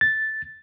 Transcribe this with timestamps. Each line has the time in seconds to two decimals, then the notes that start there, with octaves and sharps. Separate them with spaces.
0.01 A6